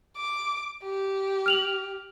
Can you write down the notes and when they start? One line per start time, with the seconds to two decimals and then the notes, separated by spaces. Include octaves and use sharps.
0.17 D6
0.84 G4
1.46 F6 F7 F#7